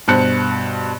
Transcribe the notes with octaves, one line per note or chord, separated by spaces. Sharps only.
G2 B2 C5 A5 F#6 C#7